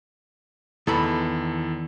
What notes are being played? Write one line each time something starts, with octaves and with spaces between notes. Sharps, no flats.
E2 D#3 E3 A4 B5